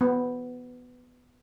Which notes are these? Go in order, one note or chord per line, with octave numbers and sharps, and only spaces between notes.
B3